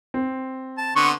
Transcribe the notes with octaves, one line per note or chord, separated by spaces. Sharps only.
C4
A5
D3 B3 C6 C#6